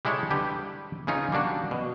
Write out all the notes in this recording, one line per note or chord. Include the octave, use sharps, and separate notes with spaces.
G3 G#3 E4 A4 C#5
D3 G3 G4 B4
C#3 E3 C#4 D#4 F4
G3 A#3 D4 F#4
B2